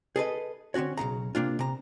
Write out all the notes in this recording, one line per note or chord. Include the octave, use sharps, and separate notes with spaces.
G#4 A4 B4 D#5
D3 C4 C#4 F#4 C#5
B1 F#2 C#3 A#5
C3 A#3 D4 F4
C3 A#5